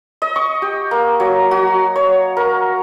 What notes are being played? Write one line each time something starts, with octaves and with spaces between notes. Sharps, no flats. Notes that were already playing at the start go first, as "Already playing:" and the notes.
D#5
C#6
G4
A#3
F#3
F#4
C#5
A#4